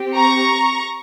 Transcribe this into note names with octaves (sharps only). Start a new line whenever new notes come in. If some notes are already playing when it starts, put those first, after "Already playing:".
Already playing: C4 G4
A#5 C#6